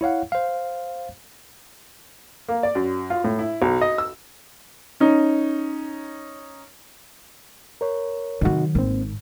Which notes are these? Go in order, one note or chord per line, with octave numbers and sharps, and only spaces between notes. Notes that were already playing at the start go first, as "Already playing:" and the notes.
E4 C#5 F5 F#5
C5 F5
A#3
D5
F#2
F4
A2
E4
B1
D#5
E6
C#4 D#4
A#4 C#5
C3 D#3 F#3 D#4 F#4
G#1 A#3 C4